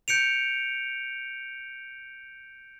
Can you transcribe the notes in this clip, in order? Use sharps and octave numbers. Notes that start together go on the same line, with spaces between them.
G6 C#7 D7 F7